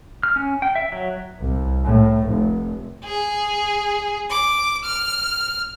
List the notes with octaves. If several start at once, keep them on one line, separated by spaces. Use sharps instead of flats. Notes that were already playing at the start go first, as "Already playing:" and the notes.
F6
C#4
G5
E5
F#3
C2
A2
F1
G#4
D6
F6